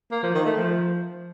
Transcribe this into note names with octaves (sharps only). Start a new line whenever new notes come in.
A#3
F3
D#3
A3
F3